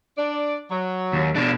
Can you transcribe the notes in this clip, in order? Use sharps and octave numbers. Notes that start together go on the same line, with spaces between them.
D4 D5
F#3
D#2
B2 D4